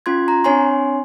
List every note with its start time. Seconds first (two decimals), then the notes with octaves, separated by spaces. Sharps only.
0.06 C#4 F4 C6 G#6
0.28 A#5
0.44 C4 D4 C#5 G#5 C6